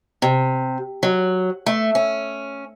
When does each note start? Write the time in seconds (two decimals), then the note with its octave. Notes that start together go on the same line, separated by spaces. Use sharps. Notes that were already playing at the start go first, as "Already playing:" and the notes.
0.22 C3
1.03 F#3
1.66 A3
1.95 C#4